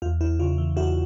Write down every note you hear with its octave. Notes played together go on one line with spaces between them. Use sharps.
E2 F4
E2 E4
C#3 F4
E3
E2 E4 F#4